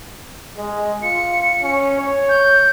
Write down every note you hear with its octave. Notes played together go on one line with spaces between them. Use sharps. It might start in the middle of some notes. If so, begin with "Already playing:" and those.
G#3
F4 C#7
C#4
C#5
G6